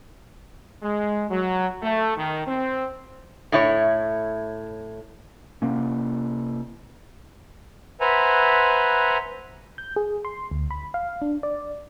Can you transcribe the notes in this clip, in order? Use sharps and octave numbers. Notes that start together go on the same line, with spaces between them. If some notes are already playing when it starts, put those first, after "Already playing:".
G#3
F#3
A3
D#3
C4
A2 E4 C#5
C3 A#3 C#4
B4 C5 E5 F#5 G#5 A#5
G6
G#4
C6
D2
B5
F5
D4
D5